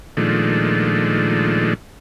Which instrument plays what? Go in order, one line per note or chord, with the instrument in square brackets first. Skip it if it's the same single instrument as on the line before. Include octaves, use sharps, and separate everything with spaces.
[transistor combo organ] A#2 D#3 F3 G#3 A3 D4